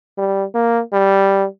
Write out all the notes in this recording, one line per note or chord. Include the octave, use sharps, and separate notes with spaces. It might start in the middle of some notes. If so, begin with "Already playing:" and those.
G3
A#3
G3